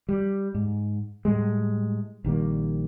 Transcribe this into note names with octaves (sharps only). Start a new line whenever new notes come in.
G3
G#2
A2 G3 G#3
A#1 D#3 G3 A#3